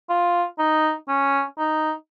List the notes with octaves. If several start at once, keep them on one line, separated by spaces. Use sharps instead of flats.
F4
D#4
C#4
D#4